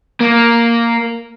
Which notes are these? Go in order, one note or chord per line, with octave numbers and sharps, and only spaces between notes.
A#3